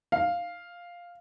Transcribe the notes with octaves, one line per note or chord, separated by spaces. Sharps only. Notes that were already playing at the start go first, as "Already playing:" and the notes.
F5